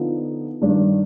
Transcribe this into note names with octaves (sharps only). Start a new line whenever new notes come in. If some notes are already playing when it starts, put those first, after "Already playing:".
Already playing: D3 F3 B3 D#4
G2 D#3 G3 D4